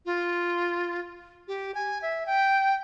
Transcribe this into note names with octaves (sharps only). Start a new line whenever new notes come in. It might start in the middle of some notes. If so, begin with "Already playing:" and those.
F4
G4
G#5
E5
G5